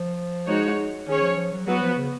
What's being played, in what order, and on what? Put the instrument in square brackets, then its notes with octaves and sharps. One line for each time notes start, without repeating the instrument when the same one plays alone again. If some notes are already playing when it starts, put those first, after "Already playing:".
Already playing: [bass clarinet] F3
[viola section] G#3 D#4 F#4 C#5
[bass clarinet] D#3 [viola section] C#4 G#4 C#5
[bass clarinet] F3
F3
F#3
[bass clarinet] F#3 [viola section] B3 F#4 B4
[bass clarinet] F3
C#3